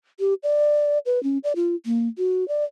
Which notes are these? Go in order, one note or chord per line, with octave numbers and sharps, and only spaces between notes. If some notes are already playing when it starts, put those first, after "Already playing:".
G4
D5
B4
C#4
D5
F4
A#3
F#4
D5